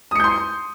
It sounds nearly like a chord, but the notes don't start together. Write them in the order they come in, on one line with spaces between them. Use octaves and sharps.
D#6 C#7 G6 C6